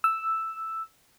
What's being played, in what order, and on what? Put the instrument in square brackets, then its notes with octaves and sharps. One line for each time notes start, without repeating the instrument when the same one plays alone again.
[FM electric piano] E6